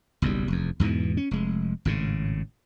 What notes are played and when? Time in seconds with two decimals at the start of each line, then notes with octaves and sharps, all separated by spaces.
0.22 F#1 B1 E2 G3
0.48 F1 E2
0.80 E2 G#2 B2 E3
1.17 C#4
1.31 F1 G#3
1.85 G#1 A2 C#3